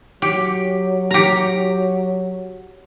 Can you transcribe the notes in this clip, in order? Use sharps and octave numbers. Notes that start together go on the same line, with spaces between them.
F#3 G4
G4 A#5